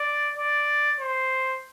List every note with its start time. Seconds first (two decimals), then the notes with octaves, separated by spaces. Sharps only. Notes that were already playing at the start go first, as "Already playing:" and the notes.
Already playing: D5
0.37 D5
1.00 C5